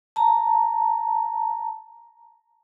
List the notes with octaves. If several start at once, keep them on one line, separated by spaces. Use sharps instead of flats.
A5 A#5